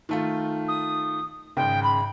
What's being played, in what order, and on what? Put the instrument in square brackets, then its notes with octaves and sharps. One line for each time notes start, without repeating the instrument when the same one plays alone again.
[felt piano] D#3 A3 F4
[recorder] D#6
[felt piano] G#1 C#3 [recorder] G5
[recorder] B5